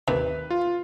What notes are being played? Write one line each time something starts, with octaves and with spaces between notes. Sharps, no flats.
D#2 C3 B4
F4